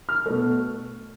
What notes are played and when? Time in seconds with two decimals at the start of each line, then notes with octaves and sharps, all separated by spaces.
0.09 F6
0.26 B2 A3